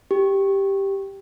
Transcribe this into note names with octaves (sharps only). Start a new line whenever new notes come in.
G4